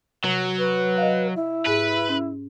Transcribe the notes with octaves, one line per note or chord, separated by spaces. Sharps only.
C3 F#3
B4
D#5 F5
E4
G#2 G#4 B4
C#4